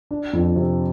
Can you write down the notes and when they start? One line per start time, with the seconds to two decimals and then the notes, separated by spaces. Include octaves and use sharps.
0.11 D4
0.33 F2
0.56 C3